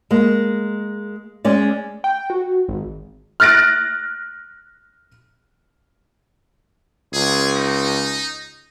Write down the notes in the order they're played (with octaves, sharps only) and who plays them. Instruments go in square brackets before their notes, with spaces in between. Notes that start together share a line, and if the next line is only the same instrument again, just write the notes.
[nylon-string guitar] G#3 A#3
G#3 C#4 D5
[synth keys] G5
F#4
G#1
[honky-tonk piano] F6 F#6 A6 A#6 D7
[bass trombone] C#2 [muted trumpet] G#4
[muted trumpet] D#4